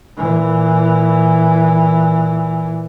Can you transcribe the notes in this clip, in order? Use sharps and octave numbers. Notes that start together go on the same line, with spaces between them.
A#2 E3